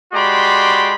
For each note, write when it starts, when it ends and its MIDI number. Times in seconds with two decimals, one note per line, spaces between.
0.13 0.95 56
0.13 0.95 66
0.13 0.95 67
0.13 0.95 74
0.13 0.95 83
0.13 0.95 84